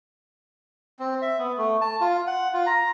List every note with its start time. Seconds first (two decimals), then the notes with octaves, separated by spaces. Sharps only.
0.99 C4
1.22 E5
1.38 B3
1.58 A3
1.81 A5
2.01 F4
2.27 F#5
2.53 F4
2.66 A#5